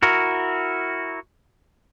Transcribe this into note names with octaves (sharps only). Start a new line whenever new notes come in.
E4 F#4 A#4